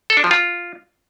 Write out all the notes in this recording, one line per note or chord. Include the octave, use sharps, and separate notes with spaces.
A4
D4
F3
F4